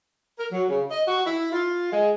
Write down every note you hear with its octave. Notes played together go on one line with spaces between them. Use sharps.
A#4
F#3
C#3
D#5
F#4
E4
F4
G#3